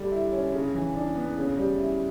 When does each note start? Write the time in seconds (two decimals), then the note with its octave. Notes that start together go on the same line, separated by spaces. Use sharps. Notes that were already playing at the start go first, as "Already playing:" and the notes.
Already playing: D3 G3 D4
0.12 E4
0.32 C#4
0.53 C#3
0.74 E3
0.95 D4
1.16 B3
1.37 C#3
1.57 G3
1.78 E4